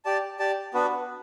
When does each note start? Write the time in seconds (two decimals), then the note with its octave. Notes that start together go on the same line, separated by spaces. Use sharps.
0.05 G4 D5 A5
0.39 G4 D5 A5
0.74 B3 D4 F#4 B4